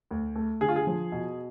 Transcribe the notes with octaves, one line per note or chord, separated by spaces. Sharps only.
D2
A3
D3 G#4
F4
G#4
F3
B2